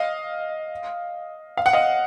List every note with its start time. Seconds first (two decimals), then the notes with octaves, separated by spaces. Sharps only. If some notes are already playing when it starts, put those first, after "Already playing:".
Already playing: D#5 F5
1.57 F5
1.66 F#5
1.73 D#5 F5